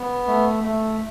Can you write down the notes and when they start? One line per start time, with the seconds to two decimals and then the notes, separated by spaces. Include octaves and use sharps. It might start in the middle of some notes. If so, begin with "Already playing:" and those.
Already playing: B3
0.27 A3
0.64 A3